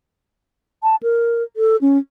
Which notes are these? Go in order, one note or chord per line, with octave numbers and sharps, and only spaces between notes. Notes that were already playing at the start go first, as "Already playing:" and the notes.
A5
A#4
A4
C#4